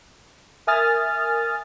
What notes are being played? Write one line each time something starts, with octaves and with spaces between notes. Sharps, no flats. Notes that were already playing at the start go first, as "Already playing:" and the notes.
A#4 E5 G#5 D#6 F6 A6